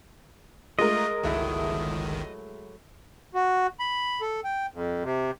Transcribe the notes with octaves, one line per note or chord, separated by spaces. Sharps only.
G#3 A3 F4 A#4 D#5
G1 C#2 D#3 F#3 A3 E4
F#4
B5
A4
G5
F2
C3